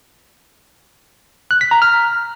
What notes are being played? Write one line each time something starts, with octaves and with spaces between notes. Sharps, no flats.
F#6
B6
A#5
F6